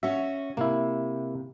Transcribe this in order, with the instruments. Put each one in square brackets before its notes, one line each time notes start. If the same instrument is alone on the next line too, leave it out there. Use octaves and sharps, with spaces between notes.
[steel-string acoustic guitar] C#4 F#4 [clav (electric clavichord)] E5
[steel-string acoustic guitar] C3 [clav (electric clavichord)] A#3 E4